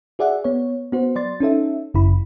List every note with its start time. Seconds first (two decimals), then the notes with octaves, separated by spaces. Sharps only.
0.19 F#4 G#4 D5 E5 F#5
0.44 B3 C#5
0.92 B3 F#4 C5
1.16 F#3 D5 C6 A6
1.40 C#4 D#4 A4 E5
1.94 G1 F#2 C#3 E4 B5